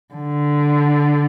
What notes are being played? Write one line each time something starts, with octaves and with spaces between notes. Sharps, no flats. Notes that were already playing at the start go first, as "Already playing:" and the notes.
D3